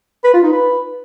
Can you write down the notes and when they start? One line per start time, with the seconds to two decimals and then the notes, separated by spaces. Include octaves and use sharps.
0.24 B4
0.34 F4
0.43 D#4
0.52 B4